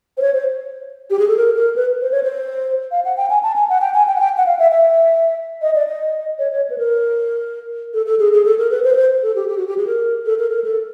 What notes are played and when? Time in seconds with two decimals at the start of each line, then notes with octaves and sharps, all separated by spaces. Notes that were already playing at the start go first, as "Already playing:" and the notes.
0.18 C5
0.22 C#5
0.34 C5
1.10 G4
1.19 G#4
1.28 A4
1.37 A#4
1.56 A#4
1.76 B4
2.01 C5
2.12 C#5
2.23 C5
2.91 F5
3.05 F#5
3.17 G5
3.30 G#5
3.43 A5
3.56 G#5
3.69 F#5
3.81 G5
3.94 G#5
4.08 G5
4.16 F#5
4.20 G5
4.37 F#5
4.46 F5
4.59 E5
4.72 E5
5.62 D#5
5.75 D5
5.88 D#5
6.39 C#5
6.52 C#5
6.70 B4
6.78 A#4
7.94 A4
8.06 A4
8.19 G#4
8.33 G#4
8.45 A4
8.59 A#4
8.71 B4
8.84 C5
8.93 B4
8.96 C5
9.23 A4
9.36 G4
9.48 G4
9.58 F#4
9.67 G4
9.78 G#4
9.87 A#4
10.26 A4
10.38 A#4
10.51 A#4
10.64 A4